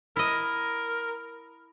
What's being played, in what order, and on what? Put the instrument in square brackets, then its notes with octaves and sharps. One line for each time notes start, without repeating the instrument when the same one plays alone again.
[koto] E4 D#5 [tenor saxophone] A#4